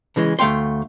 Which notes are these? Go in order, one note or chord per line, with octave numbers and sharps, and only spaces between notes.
C#3 E3 G#3
D2 A3 F5 G5 C6